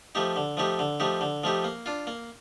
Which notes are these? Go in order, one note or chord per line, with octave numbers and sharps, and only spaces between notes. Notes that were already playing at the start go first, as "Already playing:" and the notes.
F3 A3 D#4 G4
D3
F3 A3 D#4 G4
D3
F3 A3 D#4 G4
D3
F3 A3 D#4 G4
A#3
D4 F4
A#3